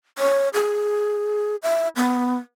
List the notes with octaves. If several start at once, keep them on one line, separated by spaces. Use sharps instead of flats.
C#5
G#4
E5
B3